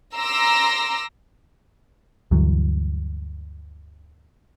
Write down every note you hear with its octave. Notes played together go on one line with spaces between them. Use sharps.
A#5 C6 D6 E6 A#6
D2 G2 E3 F#3